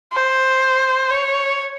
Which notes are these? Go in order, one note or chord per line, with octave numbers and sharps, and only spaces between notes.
C5
C#5